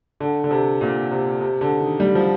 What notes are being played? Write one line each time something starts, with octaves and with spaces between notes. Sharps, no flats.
D3
D3
C3
A#2
C3
C3
D3
D#3
G3
F3